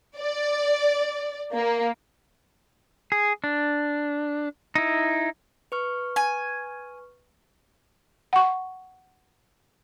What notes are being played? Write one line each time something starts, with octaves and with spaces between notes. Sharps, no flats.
D5
A#3
G#4
D4
D#4 E4
B4 C#6 F6
G#5
F#5 C#6